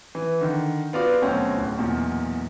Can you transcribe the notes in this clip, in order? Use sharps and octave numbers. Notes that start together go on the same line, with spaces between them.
E3
D3 D#3
B3 F4 F#4 D5
D2 B2 F#3 C4 C#4
D1
B1 E2 A#2